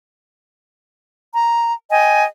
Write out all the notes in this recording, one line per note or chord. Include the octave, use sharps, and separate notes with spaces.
A#5
D#5 G5 G#5